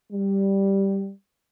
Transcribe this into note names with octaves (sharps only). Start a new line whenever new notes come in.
G3